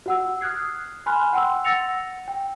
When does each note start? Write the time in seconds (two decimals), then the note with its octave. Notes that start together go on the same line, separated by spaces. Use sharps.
0.06 F#4 F#5 E6
0.41 D#6 F6 F#6 G#6 C7
1.06 G#5 B5 C6 F6 F#6
1.33 F#5 G5 C6 E6
1.64 F#5 E6 A6 A#6 C#7 F7
2.28 G5